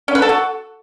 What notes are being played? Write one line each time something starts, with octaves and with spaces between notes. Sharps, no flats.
C#4
B4
A4
F#4